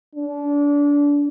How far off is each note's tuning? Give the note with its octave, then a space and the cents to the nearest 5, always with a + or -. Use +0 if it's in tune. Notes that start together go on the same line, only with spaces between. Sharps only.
D4 -25